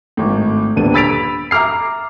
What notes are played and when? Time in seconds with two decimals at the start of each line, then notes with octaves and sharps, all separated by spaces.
0.17 G#1 A2
0.76 D#1 D3 B3 D4 D#7
0.94 B5 E6 A6 B6 D7 F7
1.51 E5 A#5 D6 F6 C7